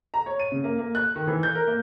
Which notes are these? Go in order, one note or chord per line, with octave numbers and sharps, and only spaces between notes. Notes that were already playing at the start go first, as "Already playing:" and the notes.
A#5
C#5
D#7
C#3
A#3
A#3
F#6
D#3
E3
G6
A#4
A#3